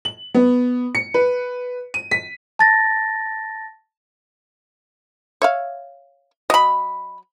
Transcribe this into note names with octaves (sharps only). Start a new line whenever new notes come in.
F#7
B3
C#7
B4
D#7
B6
A5 A6 A#6
C#5 E5 F5
F#3 D#5 B5